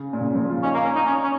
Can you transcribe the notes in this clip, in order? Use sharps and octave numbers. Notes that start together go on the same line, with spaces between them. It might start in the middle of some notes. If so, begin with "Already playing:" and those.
Already playing: C#3
A#2
C#3
F3
F4
C#4 D#4
A#3
C#4
D#4
C#4
C#4